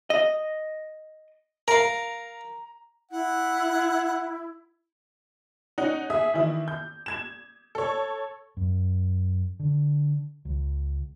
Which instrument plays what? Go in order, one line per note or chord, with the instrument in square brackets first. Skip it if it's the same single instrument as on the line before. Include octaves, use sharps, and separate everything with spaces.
[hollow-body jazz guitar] D#5
[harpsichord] A#4 F5 [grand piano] A#5
[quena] E4 [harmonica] F#5
[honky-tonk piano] C#4 D#4 F#5
G#4 E5 D#6
D#3 E3 E4
G6
G#6 E7
A4 C#5
[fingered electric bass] F#2
D3
C#2